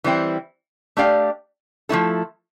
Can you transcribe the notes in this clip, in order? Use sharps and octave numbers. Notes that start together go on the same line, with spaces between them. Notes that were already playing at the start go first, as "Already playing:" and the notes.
E3 G3 C4 E4
A3 D4 G4 D5 F5
F3 A3 E4 A4